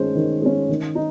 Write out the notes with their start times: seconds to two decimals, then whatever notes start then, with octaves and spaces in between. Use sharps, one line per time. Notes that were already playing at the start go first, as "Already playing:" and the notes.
Already playing: D#3 G#3 C#4 C5 C#5
0.15 D#3
0.42 G#3 C#4
0.69 D#3
0.95 D#4